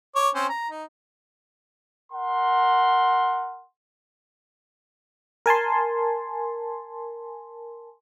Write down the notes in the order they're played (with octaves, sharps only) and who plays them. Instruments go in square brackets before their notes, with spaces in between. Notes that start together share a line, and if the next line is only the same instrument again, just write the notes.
[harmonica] C#5 D6
C4 C#4 C5
A#5
D#4
[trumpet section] A#4 F#5 C6
[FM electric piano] A#4 G#5 A5 C6